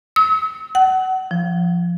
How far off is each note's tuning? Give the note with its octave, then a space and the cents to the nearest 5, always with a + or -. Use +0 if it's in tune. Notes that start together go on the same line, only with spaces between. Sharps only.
E6 -45
F#5 +25
F3 -10